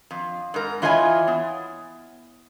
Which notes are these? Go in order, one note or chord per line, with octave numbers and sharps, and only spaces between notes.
F2
G#2 A#4
E3 F4 C#5 D#5 F#5 G#5
B3